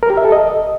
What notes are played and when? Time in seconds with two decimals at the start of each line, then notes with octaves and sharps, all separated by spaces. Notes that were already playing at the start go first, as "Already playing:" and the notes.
0.03 A#4
0.10 G4
0.17 E5
0.25 A4
0.32 D#5